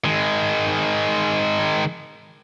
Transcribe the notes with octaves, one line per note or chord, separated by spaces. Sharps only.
D#3 G#3